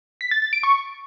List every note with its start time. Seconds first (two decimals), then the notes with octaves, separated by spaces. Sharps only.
0.21 B6
0.31 A6
0.42 A6
0.53 D7
0.63 C#6